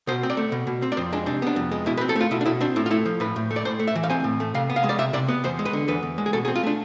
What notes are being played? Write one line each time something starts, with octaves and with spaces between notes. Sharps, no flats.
B2 C5
C4
D5
A3
B2
B2
C4
D5
F2 C5
G#3 D4
C3 D4
B3 D4
F2
G#3
B2 E4
B4
C4
A4
A3 F4
B2 E4
D4
B2 E4
C4 D4
A2 E4
F4
A3 E4
F3
A2 B4
A2
A3
D5
A2 C5
A3
E5
E3
F5
C4 G#5
A2
A3
C3 F5
B3
F5
G#3
D5
C3 E5
C3 D5
B3
E2 C5
G#3
B4
D3
E2 B4
E2
G#3
G#4
B2 A4
G#4
C4
F4
A3 D4